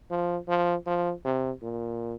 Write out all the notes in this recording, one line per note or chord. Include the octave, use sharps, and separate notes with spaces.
F3
F3
F3
C3
A#2